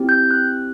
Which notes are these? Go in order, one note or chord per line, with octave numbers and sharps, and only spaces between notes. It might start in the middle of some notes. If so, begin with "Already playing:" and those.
Already playing: C4 E4 G4
G6
F#6